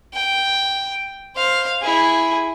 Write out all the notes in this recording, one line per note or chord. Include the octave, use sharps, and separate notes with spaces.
G5
C5 F5
E4 G#4